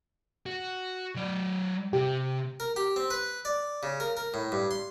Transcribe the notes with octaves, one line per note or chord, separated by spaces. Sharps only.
F#4
F#3 D5
C3 G4
A#4
G4
C4
B4
D5
C#3
A#4
A#4
A2
G2
C6